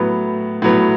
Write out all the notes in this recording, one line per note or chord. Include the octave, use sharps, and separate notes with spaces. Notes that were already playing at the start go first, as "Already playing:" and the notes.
Already playing: A2 F#3 B3
A2 F#3 B3